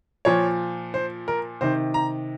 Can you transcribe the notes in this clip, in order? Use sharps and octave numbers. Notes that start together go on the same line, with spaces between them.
A#2 F3 C#5
C5
A#4
C3 D#3 C5
A#5